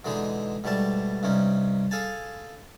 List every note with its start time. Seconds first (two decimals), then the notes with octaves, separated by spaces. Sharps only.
0.05 B2 D3 E3 G#3 D#4 G#4
0.64 G#2 B2 G3 A3 A5
1.23 G2 C3 C#4 D#4
1.91 G#4 A4 F5 G#5 A5